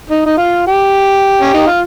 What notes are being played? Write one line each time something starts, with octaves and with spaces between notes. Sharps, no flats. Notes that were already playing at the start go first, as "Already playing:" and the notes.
D#4
D#4
F4
G4
C#4
D#4
F4